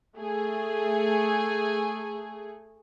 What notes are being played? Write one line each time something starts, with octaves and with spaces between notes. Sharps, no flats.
A3 G#4